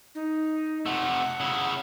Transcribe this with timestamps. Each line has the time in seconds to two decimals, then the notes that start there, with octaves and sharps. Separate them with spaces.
0.15 D#4
0.86 C3 A3 F#5
1.40 C#3 E4